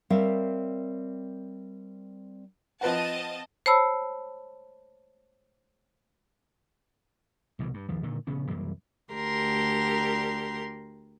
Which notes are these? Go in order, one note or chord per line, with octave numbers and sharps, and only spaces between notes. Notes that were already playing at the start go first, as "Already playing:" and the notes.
G3 C4 A#4 C#5 E5 F5
F3 C4 B4 D#5 F#5 A5
C5 C#5 A5 B5 E6
C2 B2 E3
G2
G#1 D#2 F3
A#2 D3 D#3
A#1 C#3 B3 C#4
C2 F#2 E3 A#3
D2 G4 A#4 C6